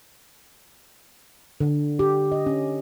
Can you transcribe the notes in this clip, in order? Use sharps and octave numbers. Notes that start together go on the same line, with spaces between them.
D3
G4
D#5
C#4